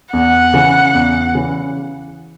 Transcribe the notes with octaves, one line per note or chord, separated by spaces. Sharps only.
E2 F#5
C#3 E3
E2
C#3 E3